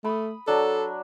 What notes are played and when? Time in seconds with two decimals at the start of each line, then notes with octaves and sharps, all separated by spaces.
0.04 A3 B5 D#6
0.47 F#3 D4 A4